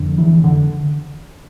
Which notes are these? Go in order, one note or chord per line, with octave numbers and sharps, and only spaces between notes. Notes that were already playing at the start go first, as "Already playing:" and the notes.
Already playing: F2 D3
E3
D3